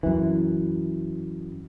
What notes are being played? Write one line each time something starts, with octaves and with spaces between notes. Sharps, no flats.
F#2 E3